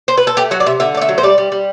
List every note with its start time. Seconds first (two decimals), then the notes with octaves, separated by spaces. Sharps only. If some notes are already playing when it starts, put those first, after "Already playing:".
0.08 C5
0.18 B4
0.27 A4
0.37 A3 G4
0.51 F#3 F#4
0.60 D5
0.66 C3 E5
0.80 D3 E5
0.95 A3 D5
1.01 E5
1.09 F#3
1.18 C5
1.23 G3 D5
1.38 G3
1.52 G3